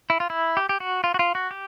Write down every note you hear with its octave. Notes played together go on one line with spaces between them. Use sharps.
E4
F4
E4
G4
G4
F#4
F4
F#4
F4
F#4
G4